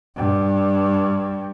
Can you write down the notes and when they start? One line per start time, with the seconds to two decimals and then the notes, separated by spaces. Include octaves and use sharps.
0.17 G2